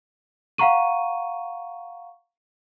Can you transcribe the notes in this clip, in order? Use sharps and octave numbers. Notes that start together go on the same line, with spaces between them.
F5 F#5 A#5 C#6 D#7